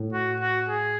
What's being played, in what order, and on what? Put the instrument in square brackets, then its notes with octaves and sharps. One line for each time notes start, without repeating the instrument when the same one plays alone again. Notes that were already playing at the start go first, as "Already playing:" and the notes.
Already playing: [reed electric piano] A2
[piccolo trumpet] F#4
F#4
G#4